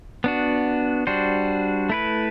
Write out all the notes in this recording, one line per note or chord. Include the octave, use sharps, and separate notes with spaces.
B3 D4 F#4
G3 D4 F#4 C5
A3 E4 B4